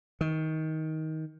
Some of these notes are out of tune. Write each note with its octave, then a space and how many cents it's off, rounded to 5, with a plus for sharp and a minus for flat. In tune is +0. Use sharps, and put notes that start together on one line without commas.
D#3 +20